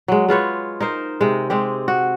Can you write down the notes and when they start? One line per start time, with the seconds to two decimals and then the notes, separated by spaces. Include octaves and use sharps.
0.08 F#3 G#3
0.29 G#3 F4 B4 C#5
0.80 D#4 A#4 C5
1.21 C3 G#3
1.50 G#3 C4 G4
1.88 F#4